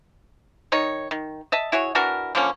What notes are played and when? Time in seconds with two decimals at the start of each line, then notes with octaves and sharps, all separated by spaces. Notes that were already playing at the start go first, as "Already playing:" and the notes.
0.72 D#3 D#4 C#5
1.11 D#3
1.52 D#5 E5 A5
1.72 E4 F#4 G#4 C#5
1.95 E3 D4 F#4 A#4
2.35 D3 F3 A#3 C#4